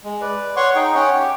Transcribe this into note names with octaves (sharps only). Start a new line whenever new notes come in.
G#3
B4 D5
C#5 F#5 C6 C#6
D#4 G#4 G5
C#4 C#5 F#5 G5
G4